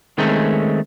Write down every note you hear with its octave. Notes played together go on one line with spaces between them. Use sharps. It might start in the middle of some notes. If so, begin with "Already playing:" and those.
D#3 G#3 A3 C4 C#4